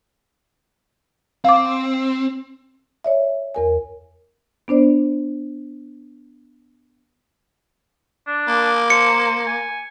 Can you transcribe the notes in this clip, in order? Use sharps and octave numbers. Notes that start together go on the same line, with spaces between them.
C4 F5 D6
C#5 D5 E5
E2 A#4 G#5
B3 D4 C5 D5
D4
A#3
C5 C#7
G#5